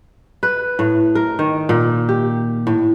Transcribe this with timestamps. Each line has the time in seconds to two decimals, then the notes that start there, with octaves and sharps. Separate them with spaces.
0.43 B4
0.79 A2
1.15 A#4
1.39 D#3
1.69 A#2
2.09 G4
2.67 A2